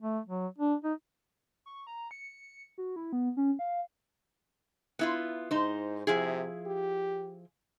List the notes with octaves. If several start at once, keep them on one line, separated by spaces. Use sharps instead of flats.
A3
F#3
D4
D#4
C#6
A#5
C#7
F#4
E4
B3
C#4
F5
B3 E4 F4
G#2 D#4 C5
C3 F3 E4 G#4
G4